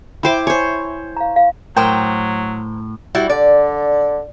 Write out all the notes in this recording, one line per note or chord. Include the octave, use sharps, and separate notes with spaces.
E4 C5 E5 G5 B5 D6
C5 C#5 G#5
F5 A#5
F5
A2 F#3 A#4 C5 G5
G3 E4 F#4
D3 D5